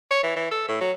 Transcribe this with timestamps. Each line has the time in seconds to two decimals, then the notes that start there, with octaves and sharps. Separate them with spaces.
0.11 C#5
0.23 E3
0.36 E3
0.51 A4
0.68 A2
0.81 F#3